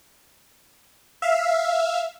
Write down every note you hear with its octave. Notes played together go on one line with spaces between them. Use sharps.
E5 F5